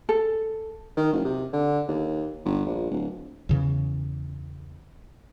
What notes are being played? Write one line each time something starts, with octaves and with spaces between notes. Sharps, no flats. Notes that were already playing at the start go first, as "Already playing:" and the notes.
A4
D#3
F#1
C3
D3
D#2
G1
A#1
D1
E2 C#3 E3